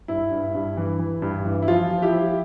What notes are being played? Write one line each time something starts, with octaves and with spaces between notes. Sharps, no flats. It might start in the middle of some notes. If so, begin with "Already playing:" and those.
G2 E4
G2
G2
E3
E3
G2
E3
E4
F3 F4
F3
E4 G4
F3